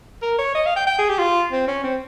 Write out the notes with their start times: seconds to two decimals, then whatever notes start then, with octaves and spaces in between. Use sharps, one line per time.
0.22 A#4
0.39 C#5
0.55 D#5
0.66 F5
0.76 G5
0.87 G5
0.98 G#4
1.09 G4
1.19 F4
1.52 C4
1.68 C#4
1.84 C4